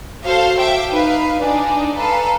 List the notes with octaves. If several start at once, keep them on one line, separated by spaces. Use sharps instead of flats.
F#4 A4 C5 F5
E5 G5 D6
D#4 B4 F5
D4 D#4 D5 G#5
A4 B4 F5 A#5